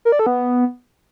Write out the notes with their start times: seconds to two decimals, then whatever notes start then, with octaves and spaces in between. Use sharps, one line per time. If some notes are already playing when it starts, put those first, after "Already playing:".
0.05 A#4
0.12 D5
0.19 A4
0.26 B3